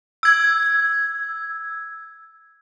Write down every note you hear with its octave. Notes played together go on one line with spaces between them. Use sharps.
E6 G#6